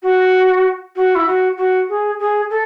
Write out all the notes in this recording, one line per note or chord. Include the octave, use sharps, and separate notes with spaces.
F#4
F#4
E4
F#4
F#4
G#4
G#4
A4